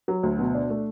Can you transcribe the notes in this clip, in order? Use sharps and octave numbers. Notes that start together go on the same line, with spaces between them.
F#3
D2
B2
D4
A3